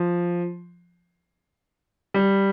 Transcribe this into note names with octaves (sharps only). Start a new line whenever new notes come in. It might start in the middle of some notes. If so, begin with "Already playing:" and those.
Already playing: F3
G3